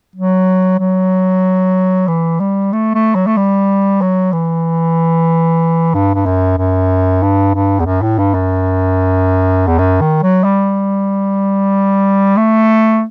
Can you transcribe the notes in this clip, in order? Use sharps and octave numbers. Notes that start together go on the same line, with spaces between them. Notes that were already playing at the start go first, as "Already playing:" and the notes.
F#3
F#3
E3
G3
A3
A3
F#3
A3
G3
F#3
E3
G2
G2
F#2
F#2
G2
G2
E2
F#2
A2
G2
F#2
E2
F#2
D#3
F#3
G3
A3